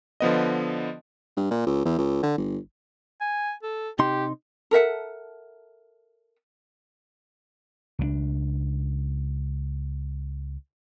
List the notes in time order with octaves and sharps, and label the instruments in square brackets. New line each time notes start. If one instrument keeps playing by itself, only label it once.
[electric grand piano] D3 F3 B3 D#5
[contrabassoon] G2
A#2
C#2
E2
C#2
D3
G1
[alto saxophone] G#5
A4
[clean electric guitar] C3 D#4 C6 [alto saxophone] G4
[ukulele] A4 A#4 E5 F#5
[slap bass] C#2 F#3 D4